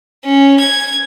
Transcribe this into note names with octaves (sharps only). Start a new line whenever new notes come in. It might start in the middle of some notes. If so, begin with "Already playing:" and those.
C#4
G#6